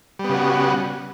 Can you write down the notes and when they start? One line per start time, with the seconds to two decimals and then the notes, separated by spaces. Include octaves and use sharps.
0.19 G3
0.24 B3
0.29 C#3
0.34 F#4